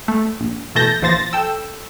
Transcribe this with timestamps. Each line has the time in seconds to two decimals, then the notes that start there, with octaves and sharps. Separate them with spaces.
0.08 A3
0.40 A#1
0.75 B2 E3 A3 A5 G6 A#6
1.01 A#1 E3 F3 C5 A6 A#6
1.33 A4 G5 E6